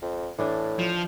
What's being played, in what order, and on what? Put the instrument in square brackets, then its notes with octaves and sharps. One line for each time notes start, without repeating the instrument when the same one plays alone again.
[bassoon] F2
[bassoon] A2 [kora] E3 D4 G#4
[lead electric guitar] F3